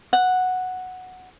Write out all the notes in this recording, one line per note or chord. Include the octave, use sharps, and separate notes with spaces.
F#5